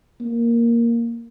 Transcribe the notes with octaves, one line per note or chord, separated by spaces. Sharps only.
A#3